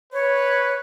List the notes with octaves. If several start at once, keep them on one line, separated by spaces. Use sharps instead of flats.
B4 C#5